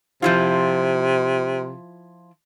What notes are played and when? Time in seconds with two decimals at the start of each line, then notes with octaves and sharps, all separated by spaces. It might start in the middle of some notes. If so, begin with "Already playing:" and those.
0.22 C3 F3 E4 F4